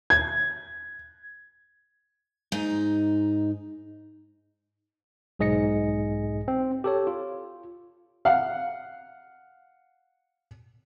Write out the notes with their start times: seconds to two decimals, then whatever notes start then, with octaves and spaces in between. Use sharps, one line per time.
0.10 G#6
2.52 G#2 D#4
5.39 B1 G#2 G#4 D#5 A#6 C#7
6.48 C4
6.84 G4 A4 C#5
7.07 F4
8.25 F5 F#5